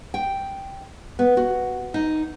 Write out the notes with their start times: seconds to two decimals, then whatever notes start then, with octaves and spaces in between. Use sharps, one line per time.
0.14 G5
1.19 B3
1.37 F#4
1.94 D#4